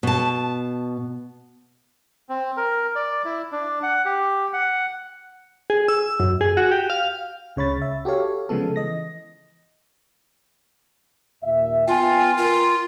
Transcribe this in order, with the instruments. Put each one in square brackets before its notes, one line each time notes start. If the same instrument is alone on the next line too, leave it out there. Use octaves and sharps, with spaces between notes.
[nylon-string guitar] B2 A5
[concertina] C4
A#4
D5
E4
D4
F#5
G4
F#5
[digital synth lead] G#4
E6
F#2
G#4
F#4
G4
F5
[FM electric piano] C#2 C#3 C#5 B5 A6
E5
F#4 G4 A4 C#5 F5
C#3 F3 G#3 B3 A4
E3 D#5 A#6
[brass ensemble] D#2 A#2 E5
[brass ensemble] B3 G5 G#5 [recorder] F4
[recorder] F4 [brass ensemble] A#4